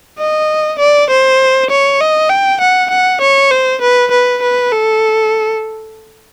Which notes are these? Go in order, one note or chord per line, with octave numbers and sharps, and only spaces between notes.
D#5
D5
C5
C#5
D#5
G5
F#5
F#5
C#5
C5
B4
B4
B4
A4